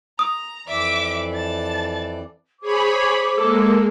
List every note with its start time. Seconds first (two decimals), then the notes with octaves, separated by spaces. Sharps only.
0.19 A#5 D#6
0.68 F2 E3 D5 E5 D6
1.34 A5 A6
2.61 G#4 C5 C#5 B5 D6
3.38 G#3 A#3 A4